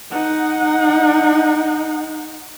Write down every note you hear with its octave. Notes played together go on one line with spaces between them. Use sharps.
D#4 F#5